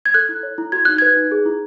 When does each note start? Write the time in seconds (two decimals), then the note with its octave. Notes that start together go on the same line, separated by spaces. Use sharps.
0.06 G#6
0.14 A4 F#6
0.29 E4
0.43 C#5
0.58 E4
0.72 F#4 G#6
0.85 D#4 F#6
0.98 B4 G#6
1.16 D#4
1.32 G#4
1.46 E4